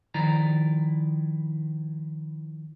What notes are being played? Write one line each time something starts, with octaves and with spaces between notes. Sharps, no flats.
D#3 F3 E4 D5 A#5